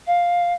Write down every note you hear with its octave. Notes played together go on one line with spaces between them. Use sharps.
F5